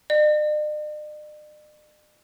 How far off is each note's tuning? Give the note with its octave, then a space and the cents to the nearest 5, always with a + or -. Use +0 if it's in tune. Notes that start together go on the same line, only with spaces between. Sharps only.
D5 +45